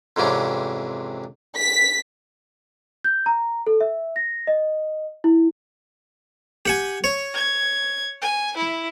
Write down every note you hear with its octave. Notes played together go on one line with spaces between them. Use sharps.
F2 G#2 C3 E3 C#4 D4
B6
G6
A#5
A4
E5
A#6
D#5
E4
G4 F#5 G#5
C#5
G#6
G#5
E4